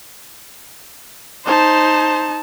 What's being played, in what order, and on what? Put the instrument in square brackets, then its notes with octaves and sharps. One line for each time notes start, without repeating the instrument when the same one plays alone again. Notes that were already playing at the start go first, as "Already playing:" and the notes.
[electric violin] D#4 A5 [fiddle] C5